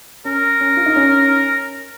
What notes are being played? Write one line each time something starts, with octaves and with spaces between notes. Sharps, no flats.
C#4 A#4
C#4
F4
D#4
C#4